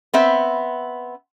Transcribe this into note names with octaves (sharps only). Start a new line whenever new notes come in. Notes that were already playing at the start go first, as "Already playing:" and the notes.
B3 C4 E5